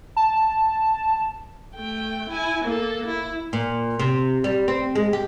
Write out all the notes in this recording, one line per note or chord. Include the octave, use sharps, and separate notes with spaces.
A5
A3 G5
E4 G#5
A#3 A4
E4
A#2
C3
G3
C4
G#3
G4